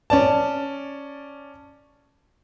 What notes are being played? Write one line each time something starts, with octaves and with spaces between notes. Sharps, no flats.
C#4 D5 A5